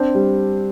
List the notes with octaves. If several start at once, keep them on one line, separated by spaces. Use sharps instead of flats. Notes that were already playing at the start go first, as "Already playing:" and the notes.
Already playing: C4 D4
G3